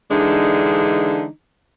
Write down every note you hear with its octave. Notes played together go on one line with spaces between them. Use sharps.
D3 E3 G#3 D4 D#4